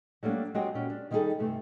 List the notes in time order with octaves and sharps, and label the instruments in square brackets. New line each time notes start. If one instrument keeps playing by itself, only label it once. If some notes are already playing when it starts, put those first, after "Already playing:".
[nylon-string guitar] F#3 G3 A3 A#3 D4
F#3 G#3 C4 F#4 G4 D#5
A#2 C#4 F#4
D4
D#3 G3 D#4 E4 G#4 A4
G2 C3 A3